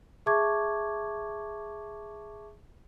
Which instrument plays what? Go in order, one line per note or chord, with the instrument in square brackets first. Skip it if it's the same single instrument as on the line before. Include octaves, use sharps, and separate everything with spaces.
[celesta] G#4 E5 A5 C#6 D6 G#6